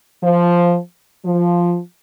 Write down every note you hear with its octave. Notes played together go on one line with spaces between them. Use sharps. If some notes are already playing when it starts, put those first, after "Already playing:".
F3
F3